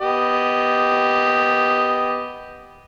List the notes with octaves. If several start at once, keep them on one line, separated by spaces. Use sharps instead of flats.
B3 G4 D#5